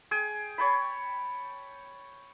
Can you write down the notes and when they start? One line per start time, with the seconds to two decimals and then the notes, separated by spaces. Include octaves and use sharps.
0.11 G#4 G5 G#5
0.58 C#5 G5 A5 B5